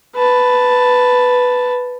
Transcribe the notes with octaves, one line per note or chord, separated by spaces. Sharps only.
B4 A5